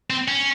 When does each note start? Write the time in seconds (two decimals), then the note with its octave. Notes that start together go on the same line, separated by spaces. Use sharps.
0.10 C4
0.28 C#4